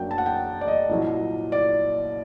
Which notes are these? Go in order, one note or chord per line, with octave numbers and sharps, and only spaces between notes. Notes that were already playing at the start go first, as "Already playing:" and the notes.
Already playing: F#2 F#3 A#3 D4 G5
A5
F#5
G5
D5
D#5
C2 A#2 F#3
D5